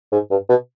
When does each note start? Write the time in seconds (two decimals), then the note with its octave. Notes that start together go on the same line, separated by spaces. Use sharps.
0.12 G#2
0.31 G2
0.49 B2